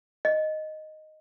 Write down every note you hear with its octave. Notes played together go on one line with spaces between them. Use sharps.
D#5